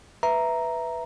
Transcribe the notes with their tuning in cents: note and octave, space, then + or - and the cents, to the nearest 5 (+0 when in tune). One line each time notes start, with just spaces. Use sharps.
B4 +0 E5 +0 A#5 +0